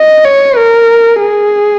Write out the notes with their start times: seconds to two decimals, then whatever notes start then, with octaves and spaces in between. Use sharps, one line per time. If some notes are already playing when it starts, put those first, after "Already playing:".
Already playing: D#5
0.25 C#5
0.57 A#4
1.20 G#4